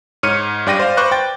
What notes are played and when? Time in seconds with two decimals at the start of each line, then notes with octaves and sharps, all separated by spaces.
0.23 G#2 C#5 F6 C#7 D#7
0.67 G2 D5 G5 A#6 D#7
0.79 C5 D5 F5
0.97 B4 C5 C#6 D6 F#6
1.11 G5 A6